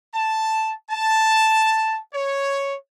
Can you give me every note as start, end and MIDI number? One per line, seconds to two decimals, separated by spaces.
0.14 0.73 81
0.91 1.98 81
2.14 2.75 73